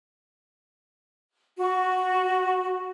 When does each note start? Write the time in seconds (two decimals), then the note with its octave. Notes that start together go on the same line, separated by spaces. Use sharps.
1.58 F#4 C#6